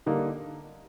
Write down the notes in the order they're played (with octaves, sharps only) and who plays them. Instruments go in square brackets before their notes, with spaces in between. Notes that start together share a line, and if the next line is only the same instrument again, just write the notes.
[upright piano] D3 G3 A#3 D#4